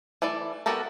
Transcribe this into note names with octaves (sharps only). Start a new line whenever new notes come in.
E3 A3 E4 D5
B3 F#4 G4 A4 A#4